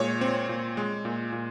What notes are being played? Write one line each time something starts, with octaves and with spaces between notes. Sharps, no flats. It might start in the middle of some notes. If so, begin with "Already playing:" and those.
Already playing: A#2 G#3 C#5
C4
A#2
G#3
A#2
A#2